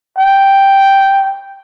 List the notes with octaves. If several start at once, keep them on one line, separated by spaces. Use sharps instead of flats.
G5